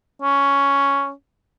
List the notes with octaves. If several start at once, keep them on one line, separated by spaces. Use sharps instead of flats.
C#4